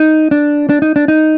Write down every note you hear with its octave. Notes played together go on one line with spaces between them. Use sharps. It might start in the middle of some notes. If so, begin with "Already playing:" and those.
Already playing: D#4
D4
D4
D#4
D4
D#4